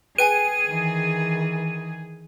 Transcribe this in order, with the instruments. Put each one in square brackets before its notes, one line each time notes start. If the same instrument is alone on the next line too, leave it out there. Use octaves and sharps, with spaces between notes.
[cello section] G#4 [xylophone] B4 G5 G#5 [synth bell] D#7
[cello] D#3 E3